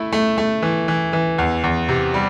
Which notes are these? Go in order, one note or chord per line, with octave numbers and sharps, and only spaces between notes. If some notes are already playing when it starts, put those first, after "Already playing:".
Already playing: A3 E4
A3
A3
E3
E3
E3
E2
E2
C3
G3